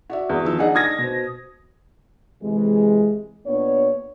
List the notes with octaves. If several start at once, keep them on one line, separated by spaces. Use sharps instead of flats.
F#4 D5 E5
E2
D#3 F3 E6
D4 D#4 G#4 D#5 F#5
D#6 G#6 A#6
B2 C5
C3 E3 G#3
A#2 B3 D4 C#5